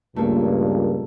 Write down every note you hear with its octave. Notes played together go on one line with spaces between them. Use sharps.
C#2 G2 A#2 A3 A#3